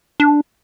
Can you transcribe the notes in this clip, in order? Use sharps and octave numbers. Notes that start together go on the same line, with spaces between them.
D4